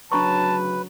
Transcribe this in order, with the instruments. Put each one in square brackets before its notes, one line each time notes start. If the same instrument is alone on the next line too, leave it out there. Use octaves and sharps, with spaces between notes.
[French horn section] D2 C#3 F#3 [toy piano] D4 A#5 C#6 [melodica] B4 [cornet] A5